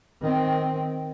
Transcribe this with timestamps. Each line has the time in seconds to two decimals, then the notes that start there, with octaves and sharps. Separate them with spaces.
0.21 D#3 C4